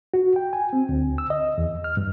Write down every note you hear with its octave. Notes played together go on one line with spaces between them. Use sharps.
F#4
G5
G#5
C4
D2
E6
D#5
E2
F6
G2